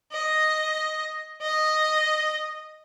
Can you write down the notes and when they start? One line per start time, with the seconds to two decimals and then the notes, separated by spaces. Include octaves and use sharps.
0.13 D#5
1.42 D#5